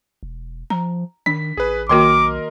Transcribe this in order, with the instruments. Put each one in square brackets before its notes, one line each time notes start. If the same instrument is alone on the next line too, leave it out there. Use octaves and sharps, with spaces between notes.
[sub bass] E1
[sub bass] F3 [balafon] A#5
[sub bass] D#3 [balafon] D4 [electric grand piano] B6
[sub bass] A1 [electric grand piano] G#4 B4
[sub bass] B1 [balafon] D#3 A#3 F#4 [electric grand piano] A#4 D#5 C6 [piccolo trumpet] D6